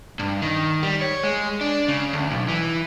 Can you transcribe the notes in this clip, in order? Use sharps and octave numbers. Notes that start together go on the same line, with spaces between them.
G2
D#3
G3
C#5
G#3
D4
C#3
D2
B1
E3